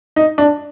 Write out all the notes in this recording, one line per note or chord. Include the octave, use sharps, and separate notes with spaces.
D#4
D4